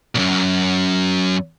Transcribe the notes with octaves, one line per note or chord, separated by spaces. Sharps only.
B1 F#2